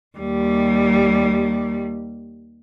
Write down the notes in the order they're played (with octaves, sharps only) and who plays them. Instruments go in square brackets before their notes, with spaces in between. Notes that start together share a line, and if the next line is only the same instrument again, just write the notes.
[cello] D#2 G3